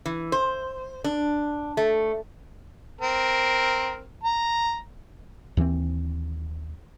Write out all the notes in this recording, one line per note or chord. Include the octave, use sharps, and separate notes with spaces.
E3
C5
D4
A3
C4 A#4
A#5
D#2 E3 A#3 C4